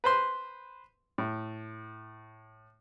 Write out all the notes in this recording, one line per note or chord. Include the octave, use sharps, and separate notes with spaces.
B4 C5 C6
A2